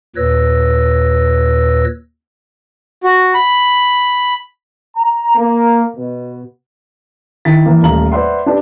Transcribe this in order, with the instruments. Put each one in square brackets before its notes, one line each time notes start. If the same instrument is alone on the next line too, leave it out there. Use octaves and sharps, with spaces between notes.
[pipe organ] D#2 A#2 B4 C#5 E6 A#6
[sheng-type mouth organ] F#4
B5
[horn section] A#5
A#3
B2
[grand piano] D#3 E4 A6 B6
E3 A#3
D#1 A3 F5 A#5 F#7
B4 C5 D5 E5 F#5 C6
D4 G4 B4 D5